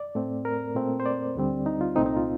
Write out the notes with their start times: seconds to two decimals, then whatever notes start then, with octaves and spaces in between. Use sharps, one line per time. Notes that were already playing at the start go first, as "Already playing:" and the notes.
Already playing: D5
0.15 A2 A3 C4
0.45 A#4
0.75 A#2 A3 C4
1.00 C5
1.06 D5
1.35 D2 D3 G3 C4
1.66 D#4
1.81 F4
1.96 C2 A#2 A3 C4 D#4
2.06 D#4
2.16 F4